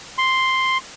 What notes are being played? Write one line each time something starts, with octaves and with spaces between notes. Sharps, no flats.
C6